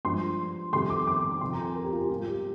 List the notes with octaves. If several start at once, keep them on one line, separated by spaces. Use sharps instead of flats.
G2 F3 G#3 C6
F2 C3 D#3 G3 C6
D6
C6
D6
F2 C3 F3 C6
A#5
G#5
A#4
G4
F4
G4
G#2 G3 F4
G4